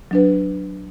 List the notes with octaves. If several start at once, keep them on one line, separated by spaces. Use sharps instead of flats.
F#3 D4 B4